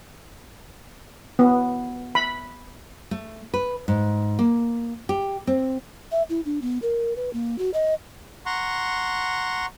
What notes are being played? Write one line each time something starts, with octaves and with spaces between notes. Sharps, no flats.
B3
B5
A3
B4
G#2
A#3
G4
C4
E5
E4
D4
B3
A#4
B4
A#3
F#4
D#5
F#5 A#5 C6 C#6